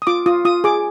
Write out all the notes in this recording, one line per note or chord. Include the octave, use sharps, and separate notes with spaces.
D#6
F4 D6
F4 D#6
F4 D#6
G#4 D6